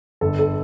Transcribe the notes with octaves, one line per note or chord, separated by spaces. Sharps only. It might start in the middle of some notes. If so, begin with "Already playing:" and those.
G1 A4
A4